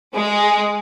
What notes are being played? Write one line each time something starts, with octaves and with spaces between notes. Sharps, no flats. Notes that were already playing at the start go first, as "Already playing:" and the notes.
G#3